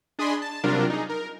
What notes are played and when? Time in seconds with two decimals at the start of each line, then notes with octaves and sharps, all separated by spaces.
0.19 D4 G#4 D#5 G#5 B5 C6
0.42 A5
0.64 C3 F#3 G3 D4 F4 A#4
0.90 D#4 G#4
1.09 A#4